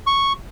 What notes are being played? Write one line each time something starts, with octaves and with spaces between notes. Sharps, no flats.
C#6